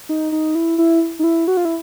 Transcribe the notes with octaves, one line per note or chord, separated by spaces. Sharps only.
D#4
D#4
E4
E4
D#4
E4
F#4
F4
E4